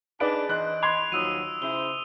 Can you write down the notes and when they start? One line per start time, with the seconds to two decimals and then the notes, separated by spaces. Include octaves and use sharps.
0.20 D4 D#4 G#4 B4 D5 D7
0.49 E3 C5 D#5 F#6
0.83 B5 C6 G#6 F7
1.12 D#2 F3 F#3 D#6 E6 D#7
1.62 C#3 E4 C5 G7